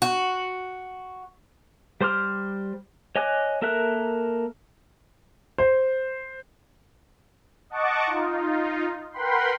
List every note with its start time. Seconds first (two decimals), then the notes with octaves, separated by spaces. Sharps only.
0.02 F#4
2.01 G3 C5 C6 D6 F6
3.16 C#5 D#5 G#5 D6 F#6
3.62 A#3 A4 A#4 E5 F#6
5.58 C5
7.70 D#5 F#5 A5 C#6 D6
8.06 D#4 F4
9.12 A#4 B4 F#5 G5 B5 C6